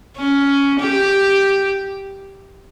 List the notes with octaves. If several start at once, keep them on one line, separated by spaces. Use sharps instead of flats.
C#4
G4